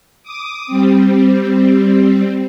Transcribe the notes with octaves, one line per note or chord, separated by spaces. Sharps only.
D6 D#6
G3 C4